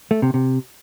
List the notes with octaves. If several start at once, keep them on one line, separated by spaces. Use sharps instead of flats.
A3
C3
C3